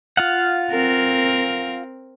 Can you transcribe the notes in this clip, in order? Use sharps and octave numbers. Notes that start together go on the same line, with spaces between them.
F4 F5 F#5
C4 A#4